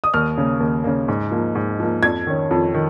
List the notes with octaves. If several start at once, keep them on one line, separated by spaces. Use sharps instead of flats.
D#6
D#2 F6
C#3 A#3
D#2
C#3 A#3
G#2
F3 A#3
G#2
F3 A#3
F2 G#6
D#3 C#4
F2
D#3